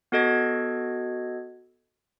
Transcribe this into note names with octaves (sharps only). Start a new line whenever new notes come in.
B3 F#4 A4 D#5 G#6